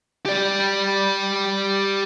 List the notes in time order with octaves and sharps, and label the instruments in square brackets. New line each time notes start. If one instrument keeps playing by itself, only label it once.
[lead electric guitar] G4 D5